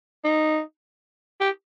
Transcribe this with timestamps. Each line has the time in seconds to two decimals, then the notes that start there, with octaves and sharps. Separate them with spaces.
0.25 D#4
1.40 G4